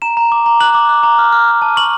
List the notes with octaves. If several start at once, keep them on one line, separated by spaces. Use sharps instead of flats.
A#5 E7
A#5
D6
A#5
F#6 F#7
D6
F#6
A#5
F6
F6
F6
A5
C#6 F#7